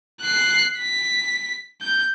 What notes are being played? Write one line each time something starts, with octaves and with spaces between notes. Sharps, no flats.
F#6 C7
B6
G6